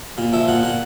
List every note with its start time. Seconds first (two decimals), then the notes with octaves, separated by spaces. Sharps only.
0.18 A#2
0.33 F3 E5
0.48 A#2 F#5
0.63 A#2 F#5